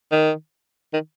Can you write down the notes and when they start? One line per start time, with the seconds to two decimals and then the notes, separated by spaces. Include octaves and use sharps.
0.11 D#3
0.93 D#3